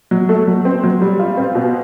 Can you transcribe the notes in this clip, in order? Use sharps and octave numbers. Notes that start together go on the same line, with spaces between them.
F#3
A3
F#3
C4
F#3
G3
F4
C4
B2